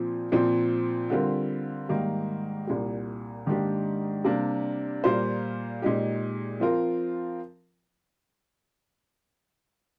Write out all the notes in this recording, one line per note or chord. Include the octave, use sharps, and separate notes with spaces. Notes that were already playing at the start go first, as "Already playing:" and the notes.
Already playing: A#2 F3 C4
A#2 F3 C4
D3 G3 C4 F4 A#4
G#2 D#3 G3 A#3
C2 A#2 G3
G#2 D#3 A#3 D4 G4
C3 G3 A#3 D4
A#2 G3 A#3 F4 C5
A#2 G#3 D#4 G4
F3 C4 F4 A#4